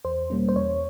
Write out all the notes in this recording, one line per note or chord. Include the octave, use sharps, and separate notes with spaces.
E2 C5
B2 G3 A#3 C#4
C5
E2 C#5